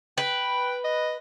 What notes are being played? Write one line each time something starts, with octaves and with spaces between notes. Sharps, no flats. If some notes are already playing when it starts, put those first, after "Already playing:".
B4 G5
D#5